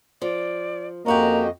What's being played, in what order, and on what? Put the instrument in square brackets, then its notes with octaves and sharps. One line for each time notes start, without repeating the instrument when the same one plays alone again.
[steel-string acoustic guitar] F3 [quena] D5
[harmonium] F2 D#5 [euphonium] A#3 [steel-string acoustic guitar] C#4 F#4 G4 [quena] A#5